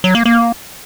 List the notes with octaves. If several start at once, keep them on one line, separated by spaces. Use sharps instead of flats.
F#3
A#3
A#3